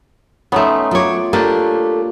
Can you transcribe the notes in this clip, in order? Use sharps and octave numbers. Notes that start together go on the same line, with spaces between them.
A3 B3 C#4 D#4 C6
F#3 F4 C#5 B5 D6
A3 A#3 D4 G4 F5